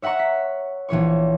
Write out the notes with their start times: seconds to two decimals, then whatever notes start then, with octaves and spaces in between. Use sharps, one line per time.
0.02 C#5 E5 F#5 A#5 C#6
0.19 B6
0.89 A#1 E3 C#5 C#6